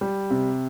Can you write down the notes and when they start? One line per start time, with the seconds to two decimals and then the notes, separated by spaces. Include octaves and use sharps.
0.01 G3
0.30 C3